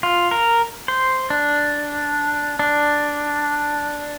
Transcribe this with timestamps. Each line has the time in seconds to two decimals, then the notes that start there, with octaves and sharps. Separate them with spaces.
0.03 F4
0.31 A#4
0.88 C5
1.30 D4
2.59 D4